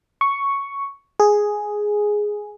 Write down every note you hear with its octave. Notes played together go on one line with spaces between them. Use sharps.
C#6
G#4